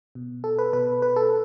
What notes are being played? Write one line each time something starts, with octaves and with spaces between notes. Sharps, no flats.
B2
A4
B4
B2 B4
B4
A4